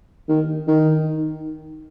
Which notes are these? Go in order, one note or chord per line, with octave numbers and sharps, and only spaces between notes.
D#3
D#3